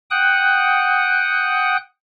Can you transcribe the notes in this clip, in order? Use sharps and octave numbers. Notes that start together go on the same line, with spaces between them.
F#5 G5 D#6 F#6